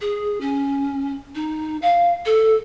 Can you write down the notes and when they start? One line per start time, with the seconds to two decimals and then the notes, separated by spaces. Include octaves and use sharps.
0.01 G#4
0.41 C#4
1.35 D#4
1.82 F5
2.25 A4